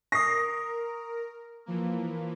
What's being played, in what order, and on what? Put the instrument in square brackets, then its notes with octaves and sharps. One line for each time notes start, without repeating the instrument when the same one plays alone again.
[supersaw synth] A#4 [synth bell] C#6 D#6 [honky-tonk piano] A#6 C7
[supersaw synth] E3 F3 A#3